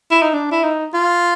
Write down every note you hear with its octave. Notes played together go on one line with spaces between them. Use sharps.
E4
D#4
D4
E4
D#4
F4